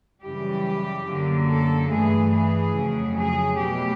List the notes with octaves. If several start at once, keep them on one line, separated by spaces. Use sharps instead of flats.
F#2 C#3 E3 G3 G4
F#2 D3 F#3 A#3
A4
G2 E3 A3 G#4
G#4
F2 C#3 F#3 A3
G#4
B2 F#3 A3 G4